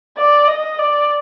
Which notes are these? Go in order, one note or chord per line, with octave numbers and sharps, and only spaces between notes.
D5
D#5
D5